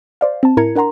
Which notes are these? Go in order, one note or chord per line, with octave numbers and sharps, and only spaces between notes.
C5 D5 F5
C4 A5
A2 E4 A#4 A#5 G#6 C#7
D4 A#4 F#5 A#5 C6